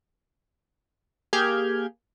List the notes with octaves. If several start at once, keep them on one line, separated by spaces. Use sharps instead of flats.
A#3 G4 G#4 F6 G6 G#6